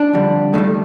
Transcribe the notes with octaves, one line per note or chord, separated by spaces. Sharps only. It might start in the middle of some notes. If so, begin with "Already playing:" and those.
Already playing: D4
F2 D3 G3
F2 D#3 G3 A3